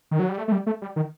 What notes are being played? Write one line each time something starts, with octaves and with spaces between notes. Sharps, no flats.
D#3
F#3
G3
A3
A3
G3
A3
G3
D#3